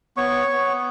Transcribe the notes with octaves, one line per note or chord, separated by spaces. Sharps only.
B3 C#5 C#6
B3